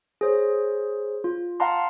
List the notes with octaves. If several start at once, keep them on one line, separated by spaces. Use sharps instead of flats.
G#4 C5 C#5
F4
F5 F#5 A5 A#5 C6